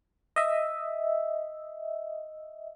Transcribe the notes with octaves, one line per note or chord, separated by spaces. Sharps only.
D#5 E5